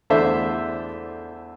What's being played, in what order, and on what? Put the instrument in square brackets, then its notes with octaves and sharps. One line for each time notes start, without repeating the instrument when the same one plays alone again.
[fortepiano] E2 D3 A3 D4 C5 E5